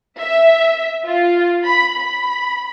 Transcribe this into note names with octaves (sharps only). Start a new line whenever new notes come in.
E5
F4
B5
B5